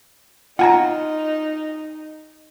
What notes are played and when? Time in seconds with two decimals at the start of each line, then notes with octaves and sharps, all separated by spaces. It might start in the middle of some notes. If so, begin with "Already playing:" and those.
0.59 D#4 F4 F#5 G#5 A#5